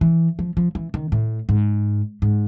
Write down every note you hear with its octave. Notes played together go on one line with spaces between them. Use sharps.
E3
F3
F3
E3
D#3
A2
G#2
G#2